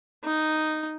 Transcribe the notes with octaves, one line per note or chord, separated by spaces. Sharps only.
D#4